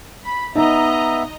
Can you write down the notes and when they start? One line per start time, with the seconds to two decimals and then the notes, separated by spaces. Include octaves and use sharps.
0.24 B5
0.55 B3 D#4 D#5 E5 A#5